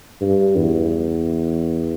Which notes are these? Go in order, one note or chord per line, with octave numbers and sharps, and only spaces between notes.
G2
E2